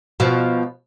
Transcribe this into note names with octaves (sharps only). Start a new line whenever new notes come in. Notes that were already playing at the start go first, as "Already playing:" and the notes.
B2 F3